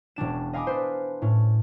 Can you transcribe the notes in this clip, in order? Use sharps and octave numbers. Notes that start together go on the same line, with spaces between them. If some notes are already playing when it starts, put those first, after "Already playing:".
E1 C#4 D4 E7
D#5 F5 G#5 B5 D6 D#6
D4 B4 C5
A2 C#4